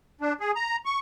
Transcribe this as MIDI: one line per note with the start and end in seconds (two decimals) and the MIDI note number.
0.21 0.33 62
0.40 0.51 68
0.56 0.76 82
0.86 0.99 85